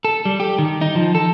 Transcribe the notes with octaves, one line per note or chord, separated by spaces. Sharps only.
A4
G3
G4
D#3
D#4
F3
A4